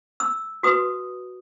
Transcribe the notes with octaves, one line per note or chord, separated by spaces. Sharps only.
E6
F#4 B4 D#6